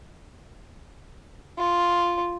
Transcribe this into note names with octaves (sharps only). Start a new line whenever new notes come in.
F4